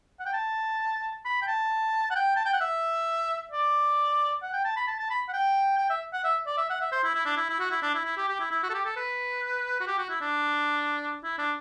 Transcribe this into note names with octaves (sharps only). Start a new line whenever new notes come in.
F#5
G5
A5
B5
G5
A5
F#5
G5
A5
G5
F#5
E5
D5
F#5
G5
A5
B5
A5
A5
B5
F#5
G5
G5
E5
F#5
E5
D5
E5
F#5
E5
C5
E4
E4
D4
E4
E4
F#4
E4
D4
E4
E4
G4
G4
E4
E4
F#4
A4
G4
A4
B4
F#4
G4
F#4
E4
D4
E4
D4